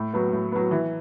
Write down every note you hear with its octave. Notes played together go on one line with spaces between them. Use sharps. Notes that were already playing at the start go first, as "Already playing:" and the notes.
Already playing: A2
F#3 B3
A2
F#3 B3
E3